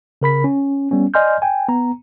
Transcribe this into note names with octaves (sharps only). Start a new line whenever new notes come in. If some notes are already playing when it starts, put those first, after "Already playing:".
C#3 A#4 B5 B6
C#4
G3 B3 C#4
D5 D#5 G#5 C6 F6 G6
G5 G#5
B3 A#5